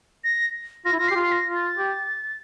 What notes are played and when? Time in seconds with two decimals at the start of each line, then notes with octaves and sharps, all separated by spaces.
0.24 A#6
0.85 F4 A#6
0.93 E4
0.98 F4 A#6
1.08 G4 C7
1.16 F4
1.23 C7
1.32 A#6
1.46 F4
1.55 A6
1.77 G4